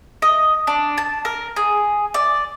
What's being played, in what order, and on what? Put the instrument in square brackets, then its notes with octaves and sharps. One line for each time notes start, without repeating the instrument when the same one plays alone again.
[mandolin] D#5
D4
A5
A#4
G#4
D5